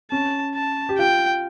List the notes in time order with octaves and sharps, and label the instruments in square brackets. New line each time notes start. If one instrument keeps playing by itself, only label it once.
[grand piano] C#4 [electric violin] A5
[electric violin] A5
[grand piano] G4
[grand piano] F4 [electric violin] G5